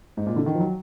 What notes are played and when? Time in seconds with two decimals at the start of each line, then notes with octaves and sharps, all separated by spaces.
0.17 G#2
0.26 A#2
0.36 D3
0.46 D#3
0.54 F3
0.60 F#3